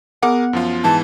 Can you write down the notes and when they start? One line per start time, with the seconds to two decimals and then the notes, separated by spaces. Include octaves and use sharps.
0.23 B3 G#4 A#4 F#5 D6
0.53 F#2 F3 F4
0.84 G#2 E3 A5